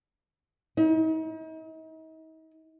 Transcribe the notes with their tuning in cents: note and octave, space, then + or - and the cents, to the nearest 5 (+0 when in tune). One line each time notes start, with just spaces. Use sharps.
D#4 +40